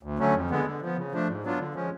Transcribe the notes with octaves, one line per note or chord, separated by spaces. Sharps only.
D2
D3 F#3 A3 C#4
F2
D3 G#3 B3
D3
F3 B3
C#3
F3 A3 D4
G#2
F#3 B3 D4 F4
D3
F3 G#3 C#4